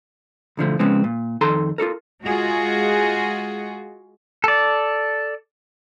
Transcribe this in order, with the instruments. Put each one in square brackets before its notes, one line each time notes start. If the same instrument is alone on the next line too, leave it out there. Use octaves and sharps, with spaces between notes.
[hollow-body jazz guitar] B1 D3 F3 A3
C#3 F3 G#3 B3 C4
A#2
F2 D#3 A4 A#5 C6
F4 F#4 A4 A#4
[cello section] G#3 F4 F#4 G#4
[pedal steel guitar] A4 D5